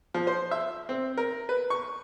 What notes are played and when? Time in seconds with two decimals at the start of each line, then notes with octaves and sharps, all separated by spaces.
0.14 F3
0.27 C5
0.51 E5
0.89 C4
1.18 A#4
1.49 B4
1.70 C#6